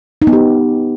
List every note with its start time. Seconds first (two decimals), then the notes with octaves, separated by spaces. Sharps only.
0.22 D#4
0.27 B3
0.33 G4